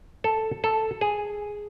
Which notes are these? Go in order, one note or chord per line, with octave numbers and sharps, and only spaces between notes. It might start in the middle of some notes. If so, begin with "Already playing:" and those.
A4
A4
G#4